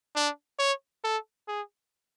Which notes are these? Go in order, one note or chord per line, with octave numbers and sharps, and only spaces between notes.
D4
C#5
A4
G#4